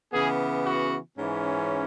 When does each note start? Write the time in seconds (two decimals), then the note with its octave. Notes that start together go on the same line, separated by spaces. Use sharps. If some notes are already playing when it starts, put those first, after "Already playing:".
0.12 C#3 E3 B3 G#4
0.65 F#4
1.18 G#2 E3 C#4